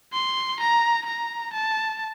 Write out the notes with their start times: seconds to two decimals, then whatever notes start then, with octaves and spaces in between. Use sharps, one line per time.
0.13 C6
0.60 A#5
1.06 A#5
1.53 A5